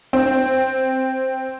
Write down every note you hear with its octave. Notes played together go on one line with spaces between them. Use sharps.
C4